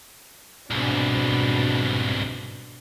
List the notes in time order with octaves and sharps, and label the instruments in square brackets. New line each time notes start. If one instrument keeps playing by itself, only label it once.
[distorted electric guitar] C2 G#2 [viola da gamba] B2 D4